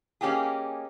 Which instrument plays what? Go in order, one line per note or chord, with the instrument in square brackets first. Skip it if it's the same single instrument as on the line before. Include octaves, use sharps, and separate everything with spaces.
[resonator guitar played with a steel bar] A#3 C#4 D#4 G4 G#4